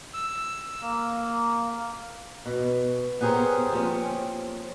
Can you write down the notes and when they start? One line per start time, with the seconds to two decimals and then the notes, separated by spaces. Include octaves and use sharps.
0.14 E6
0.81 A#3
2.46 B2
3.21 B3 G4 G#4 A#4 C5 C#5
3.72 F3 A#3 C4 C#4